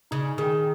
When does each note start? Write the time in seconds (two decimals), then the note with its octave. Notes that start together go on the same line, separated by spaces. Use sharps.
0.11 C#3 D#4
0.38 D#3 G#4